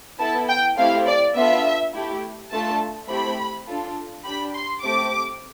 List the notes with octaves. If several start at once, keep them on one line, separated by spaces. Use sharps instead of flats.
B3 E4 A4 A5
G5
A3 C4 E4 G4 F5
D5
B3 D4 F4 A4 E5
A3 E4 G4
A3 D4 F4 A4 A5
A3 C4 E4 G4 B5
D4 F4 A4
D4 G4 B5
C6
A3 C4 G4 D6